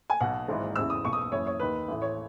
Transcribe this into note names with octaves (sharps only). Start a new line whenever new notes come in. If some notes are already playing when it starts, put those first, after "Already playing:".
G#5
B1 B2 F#5
G#1 G#2 E3
F#1 E2 C#3 E3 E6
D#6
B1 B2 C#6
D#6
F#1 F#2 E3 C#5
C#5
D#2 D#3 B4
A1 A2 E3
C#5